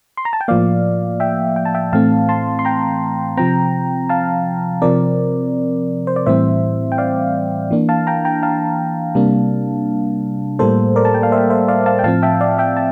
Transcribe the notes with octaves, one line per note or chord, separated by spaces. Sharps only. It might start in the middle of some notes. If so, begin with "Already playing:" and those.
C6
A#5
A5
G5
A2 F3 A#3 D5 F5
E5 G5
G5
A5
E5 G5
A2 E3 A3 C4 F5 A5
A5 C6
C6
G5 A#5
C3 F3 C4 G5 A#5
F5 A5
C3 F3 C4 A#4 D5
C5
D5
A2 E3 G3 C4 C5 E5
G5
D5 F5
E3 A#3 D4
F5 A5
G5 A#5
G5 A#5
F5 A5
C3 G3 A#3 D4
A2 G3 A#3 A4 C5
A#4 D5
A5
G5
F5
C5 E5
C5 E5
D5 F5
F5 A5
G5
A2 F3 C4 F5 A5
E5 G5
D5 F5
E5 G5
A5